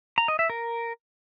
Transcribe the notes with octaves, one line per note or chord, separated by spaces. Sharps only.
A#5
D#5
E5
A#4